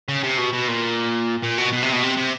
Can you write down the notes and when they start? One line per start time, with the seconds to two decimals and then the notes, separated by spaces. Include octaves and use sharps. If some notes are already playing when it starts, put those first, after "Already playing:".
0.08 C#3
0.23 C3
0.38 B2
0.53 B2
0.68 A#2
1.43 A#2
1.58 B2
1.73 B2
1.83 C3
1.93 B2
2.03 C3
2.17 C3